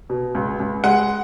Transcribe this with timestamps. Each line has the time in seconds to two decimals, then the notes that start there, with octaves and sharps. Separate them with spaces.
0.10 B2
0.35 C#2
0.60 C#2
0.84 G#3 F#5